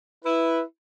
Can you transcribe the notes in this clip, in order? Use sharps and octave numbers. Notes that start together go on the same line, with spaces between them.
E4 B4